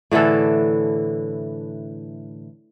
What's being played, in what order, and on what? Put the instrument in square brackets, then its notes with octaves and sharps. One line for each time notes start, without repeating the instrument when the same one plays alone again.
[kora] A2 D3 E3 A4